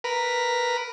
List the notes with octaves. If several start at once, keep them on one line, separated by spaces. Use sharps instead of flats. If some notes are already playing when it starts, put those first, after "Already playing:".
A#4 B4